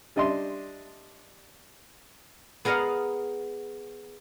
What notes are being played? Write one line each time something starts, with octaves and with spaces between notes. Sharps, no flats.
G3 D4 D#5 E5 C6
B3 G#4 A#4 D#5 F5 F#5